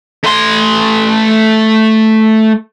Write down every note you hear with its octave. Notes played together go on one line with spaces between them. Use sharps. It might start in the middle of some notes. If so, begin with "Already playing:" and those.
A3 C6